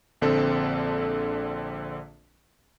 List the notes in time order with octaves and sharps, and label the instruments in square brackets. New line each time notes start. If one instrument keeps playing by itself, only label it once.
[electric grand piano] A#1 D3 C4 A4